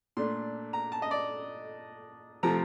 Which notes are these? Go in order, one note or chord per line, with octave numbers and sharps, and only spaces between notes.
A#2 A3 D4 C6
A#5
A5
D#5
D5
C3 F3 A3 C4 A#5